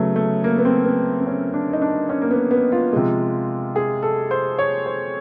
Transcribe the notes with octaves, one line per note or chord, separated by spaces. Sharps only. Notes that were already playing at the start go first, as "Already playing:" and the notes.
Already playing: C#3 F#3 A3 B3
A3
A#3
B3
C4
B3
C4
C#4
D4
D#4
D4
C#4
A#3
B3
B3
F4
C3 F3 G#3
G#4
A4
C5
C#5
C5